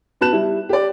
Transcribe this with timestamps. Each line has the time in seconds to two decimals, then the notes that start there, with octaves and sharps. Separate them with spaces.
0.21 B3 F#4 B4 A5 F#6 E7
0.33 G3 E4
0.69 G4 D5